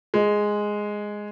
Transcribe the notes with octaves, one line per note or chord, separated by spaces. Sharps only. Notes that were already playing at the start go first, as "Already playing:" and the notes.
G#3